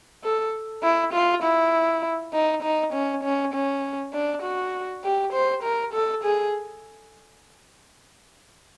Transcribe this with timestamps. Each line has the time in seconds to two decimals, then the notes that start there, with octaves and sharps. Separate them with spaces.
0.24 A4
0.83 E4
1.13 F4
1.43 E4
2.33 D#4
2.63 D#4
2.93 C#4
3.23 C#4
3.54 C#4
4.13 D4
4.43 F#4
5.04 G4
5.33 C5
5.63 A#4
5.93 A4
6.24 G#4